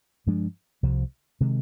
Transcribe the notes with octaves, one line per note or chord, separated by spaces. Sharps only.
G2 F3 G#3 D4
C2 C3 F3
C3 D#3 G#3